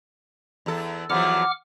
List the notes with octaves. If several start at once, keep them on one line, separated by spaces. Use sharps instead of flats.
E2 A4
E2 F3 F#3 F#5 D6 F6